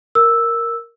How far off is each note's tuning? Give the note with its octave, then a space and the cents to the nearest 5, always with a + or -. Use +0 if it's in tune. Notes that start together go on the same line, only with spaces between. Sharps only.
A#4 +0 E6 +0